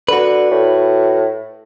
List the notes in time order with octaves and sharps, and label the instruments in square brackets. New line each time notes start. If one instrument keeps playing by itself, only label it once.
[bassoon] D3 [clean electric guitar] F#4 B4
[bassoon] A2